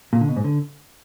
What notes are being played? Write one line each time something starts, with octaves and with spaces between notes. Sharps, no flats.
A#2
D3
B2
G#2
D3